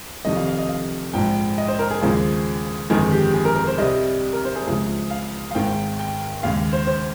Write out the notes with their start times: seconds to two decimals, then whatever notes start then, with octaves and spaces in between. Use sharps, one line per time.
0.25 F1 F2 D#3 G3 D#5
0.36 F5
0.47 F5
0.58 D#5
0.69 F5
1.13 A#1 G#2 F3 G5
1.58 D#5
1.68 C5
1.79 A#4
1.91 G#4
2.01 D#2 C#3 F3 G#3
2.90 G1 F2 D#3 G#3 G#4
3.12 G4
3.34 G#4
3.45 A#4
3.56 A#4
3.67 C5
3.78 C2 C3 G3 D#5
4.33 A#4
4.45 C5
4.55 G#4
4.66 C#2 C#3 F3 G#3 G#4
5.10 F5
5.51 F5
5.55 G#1 G#2 D#3 G#3 G5
5.99 G5
6.43 D#2 C#3 G#3 F5
6.73 C5
6.87 C5